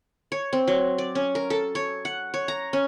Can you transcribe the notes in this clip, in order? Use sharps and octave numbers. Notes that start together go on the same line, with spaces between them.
C#5
C4
F#3
D5
C#4
A#4
A4
C#5
F#5
C#5
A#5
C#4